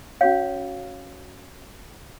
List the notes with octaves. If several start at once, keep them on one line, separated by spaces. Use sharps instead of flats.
C#4 F#4 C#5 F5